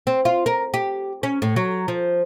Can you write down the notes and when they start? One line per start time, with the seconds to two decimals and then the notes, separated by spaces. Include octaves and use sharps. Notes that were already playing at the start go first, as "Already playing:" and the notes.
0.07 C4
0.25 F4
0.46 A#4
0.74 G4
1.23 C#4
1.42 A2
1.56 F#3
1.88 F3